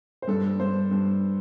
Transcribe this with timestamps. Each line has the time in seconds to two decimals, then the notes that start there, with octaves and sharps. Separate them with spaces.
0.22 C5
0.28 G2 A4
0.59 G2 C5
0.91 G2